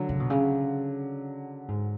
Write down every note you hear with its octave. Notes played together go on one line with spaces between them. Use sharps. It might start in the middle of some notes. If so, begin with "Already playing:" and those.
Already playing: D3 F#3
C#3
B2
C#3
G#2